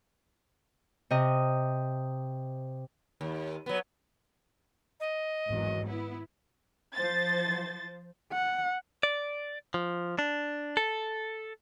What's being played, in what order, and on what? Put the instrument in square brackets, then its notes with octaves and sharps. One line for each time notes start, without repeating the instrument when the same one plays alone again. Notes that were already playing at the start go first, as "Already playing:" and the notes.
[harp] C3 D#5
[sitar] D#2
F#3 B3
[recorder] D#5
[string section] G#1 E2 F#3
B3 E4
F3 C5 A6
[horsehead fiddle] F#5
[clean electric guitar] D5
F3
D4
A4